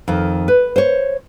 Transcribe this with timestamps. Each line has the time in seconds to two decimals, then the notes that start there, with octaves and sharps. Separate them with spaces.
0.08 F2 D#3
0.48 B4
0.76 C5 C#5